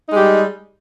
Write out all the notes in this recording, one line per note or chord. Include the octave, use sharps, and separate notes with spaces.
G3 G#3 D#4 G4